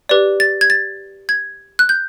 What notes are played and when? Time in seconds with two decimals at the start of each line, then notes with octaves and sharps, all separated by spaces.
0.09 G4 B4 D5
0.40 A6
0.61 G#6
0.70 A6
1.29 G#6
1.79 F#6
1.89 G6